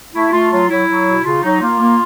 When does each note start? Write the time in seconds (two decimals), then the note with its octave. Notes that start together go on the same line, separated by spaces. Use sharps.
0.14 A3 E4
0.32 A3 F4
0.51 F#3 F4
0.69 F#3 E4
0.88 F#3
1.06 B2
1.24 C#3 F4
1.42 F#3 D#4
1.61 A#3 F4
1.80 A#3